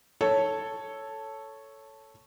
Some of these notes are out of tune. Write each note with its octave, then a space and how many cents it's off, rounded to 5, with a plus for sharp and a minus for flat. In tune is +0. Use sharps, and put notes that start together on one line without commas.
A4 +0 C#5 +0